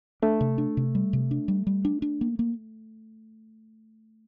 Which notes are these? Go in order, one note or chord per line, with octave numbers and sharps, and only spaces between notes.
A3 D4
C3
D4
C3
G3
C3
D4
G3
G3
D4
D4
A#3
A#3